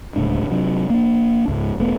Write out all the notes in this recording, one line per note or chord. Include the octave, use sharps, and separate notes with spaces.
D1 C#2 A2 D4
C3 F#3 D4
A#3 D4
C#2 G#2
E1 A3 B3